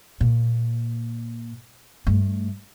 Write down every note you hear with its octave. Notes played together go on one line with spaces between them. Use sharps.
A#2
G2 A3